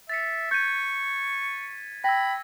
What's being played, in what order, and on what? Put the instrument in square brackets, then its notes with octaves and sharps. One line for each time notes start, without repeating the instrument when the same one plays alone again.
[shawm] E5 [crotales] A6 B6 C#7
[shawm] C#6 [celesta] G6 [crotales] G#6 D#7
[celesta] G5 [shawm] B5 [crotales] E6 G#6 A#6